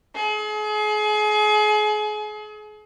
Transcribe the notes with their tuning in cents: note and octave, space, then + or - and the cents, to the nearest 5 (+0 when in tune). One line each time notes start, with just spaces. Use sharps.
G#4 +35